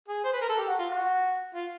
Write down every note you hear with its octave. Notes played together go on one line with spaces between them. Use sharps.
G#4
C5
B4
A#4
A4
G4
F#4
F4
F#4
F4